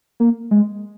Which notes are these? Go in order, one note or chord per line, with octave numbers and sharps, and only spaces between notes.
A#3
G#3